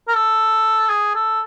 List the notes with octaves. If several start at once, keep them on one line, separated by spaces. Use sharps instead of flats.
A#4
A4
G#4
A4